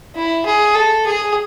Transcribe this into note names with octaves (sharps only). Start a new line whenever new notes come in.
E4
G#4
A4
G#4